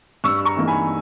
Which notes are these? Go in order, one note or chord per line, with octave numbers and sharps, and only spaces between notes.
G2 C#6 E6
A#5 C#6
E3 A#3 D#4
G#5 B5